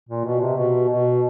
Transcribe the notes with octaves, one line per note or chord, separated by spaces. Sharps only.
A#2
B2
C3
B2
B2